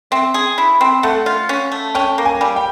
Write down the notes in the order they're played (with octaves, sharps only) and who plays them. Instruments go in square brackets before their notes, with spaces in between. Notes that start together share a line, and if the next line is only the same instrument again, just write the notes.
[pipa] C4 [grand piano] E5
[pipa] G#4
E4
C4
[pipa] A3 [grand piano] F#5
[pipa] F4
C#4
A3
[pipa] C#4 [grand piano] G5
[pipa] A#3
[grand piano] G#5
[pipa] G3
[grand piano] G5